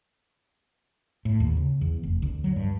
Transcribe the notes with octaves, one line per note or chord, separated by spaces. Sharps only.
A2
D#2
C#3
E2
F1
D2
F#3
G2